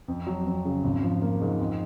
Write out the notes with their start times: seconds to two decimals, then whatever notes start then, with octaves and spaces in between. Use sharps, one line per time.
0.08 F2
0.27 F#3
0.46 F2
0.65 C#3
0.84 G#1
1.03 F3
1.22 A#3
1.41 G#2
1.60 F2